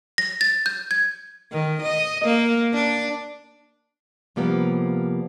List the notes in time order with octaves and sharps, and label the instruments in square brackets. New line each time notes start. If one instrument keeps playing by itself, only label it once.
[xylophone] A#6
A6
G6
G#6
[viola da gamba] D#3
D#5
A#3
D4
[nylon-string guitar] C3 F3 G3 A#3 B3